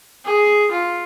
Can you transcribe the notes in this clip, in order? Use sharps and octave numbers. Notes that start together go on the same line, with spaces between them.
G#4
F4